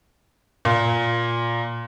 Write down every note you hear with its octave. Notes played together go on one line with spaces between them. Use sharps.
A#2